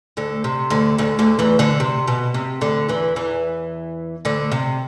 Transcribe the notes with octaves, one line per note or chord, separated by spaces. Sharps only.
D2 D3
C3
D2 D3
D2 D3
D2 D3
E2 E3
D2 D3
C3
B2
C3
D2 D3
E2 E3
E2 E3
D2 D3
C3